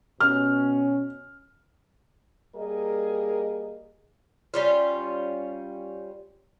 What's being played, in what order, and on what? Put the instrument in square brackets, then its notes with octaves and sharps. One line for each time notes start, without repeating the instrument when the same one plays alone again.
[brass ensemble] B2 C#4 [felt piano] F6
[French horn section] G3 A#3 G#4 A#4 D#5
[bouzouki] G3 C#4 F4